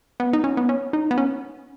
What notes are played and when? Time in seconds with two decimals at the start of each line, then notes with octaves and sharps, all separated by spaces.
0.20 B3
0.33 D#4
0.44 C#4
0.57 B3
0.69 C#4
0.93 D#4
1.11 B3
1.18 C#4